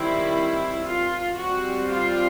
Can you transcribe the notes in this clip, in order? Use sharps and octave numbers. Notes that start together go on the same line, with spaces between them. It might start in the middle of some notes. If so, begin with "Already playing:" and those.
Already playing: D#3 G3 C4 E4
F4
G3 C4 F#4
F4